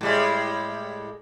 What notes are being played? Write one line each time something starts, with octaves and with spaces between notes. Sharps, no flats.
A2 G3 G#3